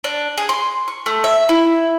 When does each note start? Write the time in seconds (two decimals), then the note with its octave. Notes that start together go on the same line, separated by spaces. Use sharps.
0.04 D4
0.38 G#4
0.49 C6
0.88 C#6
1.06 A3
1.24 E5
1.49 E4